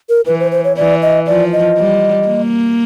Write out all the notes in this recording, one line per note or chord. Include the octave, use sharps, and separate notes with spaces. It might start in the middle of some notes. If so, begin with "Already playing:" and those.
A#4
E3 B4
C5
C5
C#5
E3 D5
D#5
F3 D5
D#5
G3
A#3